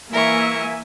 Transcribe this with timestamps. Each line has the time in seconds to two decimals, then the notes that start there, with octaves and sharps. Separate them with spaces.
0.13 E3 A#3 A#4 E5 G#5 C#6